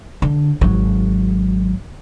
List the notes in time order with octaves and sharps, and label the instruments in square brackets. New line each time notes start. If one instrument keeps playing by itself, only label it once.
[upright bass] D3
G#1 F#3